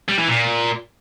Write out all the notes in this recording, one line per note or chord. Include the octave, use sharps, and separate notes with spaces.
G3
E3
A#2